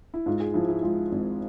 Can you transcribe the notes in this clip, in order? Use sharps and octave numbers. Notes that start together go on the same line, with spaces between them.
E4
G#2 F4
G#4
F3 E4
E4
G#3 F4
G#1